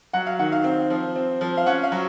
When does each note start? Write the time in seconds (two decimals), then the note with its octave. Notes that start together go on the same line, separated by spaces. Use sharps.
0.13 F#3 F#5
0.27 F5
0.39 D#3 F#5
0.52 F5
0.64 C4
0.90 F3
1.16 C4
1.41 F3
1.57 F5
1.66 C#4 F#5
1.83 F5
1.92 F#3